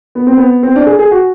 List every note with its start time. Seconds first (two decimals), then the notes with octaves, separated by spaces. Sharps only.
0.15 B3
0.27 C4
0.37 B3
0.63 C4
0.76 D4
0.86 G#4
0.99 G#4
1.11 F#4